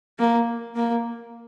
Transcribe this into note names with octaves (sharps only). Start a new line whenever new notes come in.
A#3
A#3